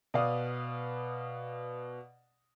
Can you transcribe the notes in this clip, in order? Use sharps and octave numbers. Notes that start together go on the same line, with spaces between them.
B2 B4 D5 F5 D#6